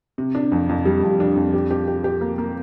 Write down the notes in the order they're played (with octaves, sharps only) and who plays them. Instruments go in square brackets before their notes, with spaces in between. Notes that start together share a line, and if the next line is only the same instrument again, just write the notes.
[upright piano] C3
D4
F2
F2
G3
F2
D4
F2
G4
G4
G4
G4
A#3
A#3